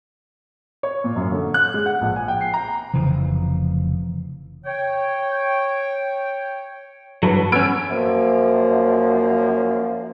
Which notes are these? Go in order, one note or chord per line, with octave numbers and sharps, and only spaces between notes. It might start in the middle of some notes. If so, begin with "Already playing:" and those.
C#5
A#2
F#2
D3
F#6
G#3
F#5
A#1
G#5
G5
C7
A#5
F1 C#3 E3 F3
C#5 G5
G2 E3 F#3 A4 B4
B3 C#4 E6 G#6 D7
F#2 F3 A#3